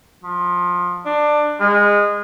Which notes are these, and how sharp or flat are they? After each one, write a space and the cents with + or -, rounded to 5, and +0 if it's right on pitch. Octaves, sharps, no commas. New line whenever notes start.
F3 +20
D4 +20
G#3 -20